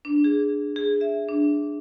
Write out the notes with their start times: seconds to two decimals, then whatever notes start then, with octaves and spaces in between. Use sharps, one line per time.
0.05 D4
0.24 G#4
0.76 G#4
1.01 E5
1.28 D4